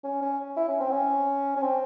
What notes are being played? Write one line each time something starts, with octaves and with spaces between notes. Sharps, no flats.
C#4
C#4
E4
C#4
C4
C#4
C#4
C4